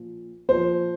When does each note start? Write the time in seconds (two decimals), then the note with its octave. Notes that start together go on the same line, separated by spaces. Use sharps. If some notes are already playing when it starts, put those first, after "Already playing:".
Already playing: A#2 F3
0.48 A#2 F3 C5